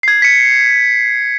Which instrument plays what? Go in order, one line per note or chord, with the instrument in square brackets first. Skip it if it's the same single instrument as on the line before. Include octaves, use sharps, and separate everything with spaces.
[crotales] G#6 C7
B6 C#7